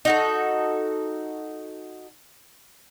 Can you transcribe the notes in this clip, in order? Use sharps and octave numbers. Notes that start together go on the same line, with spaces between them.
D#4 F#4 A4